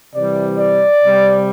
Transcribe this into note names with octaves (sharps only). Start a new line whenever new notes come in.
C3 E3 G3 D5
D5
C3 G3